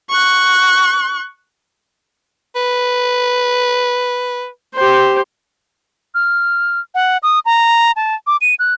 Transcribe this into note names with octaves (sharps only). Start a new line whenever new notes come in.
C#6 F#6
B4
G4 C5
F6
F#5
D#6
A#5
A5
D6
D#7
F#6